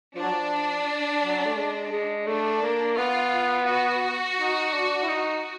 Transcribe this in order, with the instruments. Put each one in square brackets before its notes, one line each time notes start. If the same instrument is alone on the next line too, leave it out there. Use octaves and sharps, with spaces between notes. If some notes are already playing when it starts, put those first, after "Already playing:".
[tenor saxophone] F3 [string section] D4
[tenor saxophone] F#3
F3
F#3
A3
G#3
G#3
[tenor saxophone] A3 [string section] D4
[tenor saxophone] A#3
[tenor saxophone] B3 [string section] F4
[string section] F#4
[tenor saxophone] D#4
D4
E4
D#4